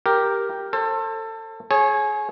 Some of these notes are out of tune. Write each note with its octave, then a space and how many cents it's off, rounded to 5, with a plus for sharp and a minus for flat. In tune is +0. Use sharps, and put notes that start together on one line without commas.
G4 +0 A#4 +0
A4 +25 C5 +35
G#4 +25 C#5 -20